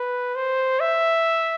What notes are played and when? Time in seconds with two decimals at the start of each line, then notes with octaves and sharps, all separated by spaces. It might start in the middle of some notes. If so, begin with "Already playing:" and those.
Already playing: B4
0.35 C5
0.80 E5